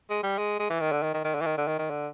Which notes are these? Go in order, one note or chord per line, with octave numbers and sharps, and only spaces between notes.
G#3
G3
G#3
G#3
E3
D#3
D3
D#3
D#3
D#3
D3
E3
D#3
D3
D#3
D#3
D3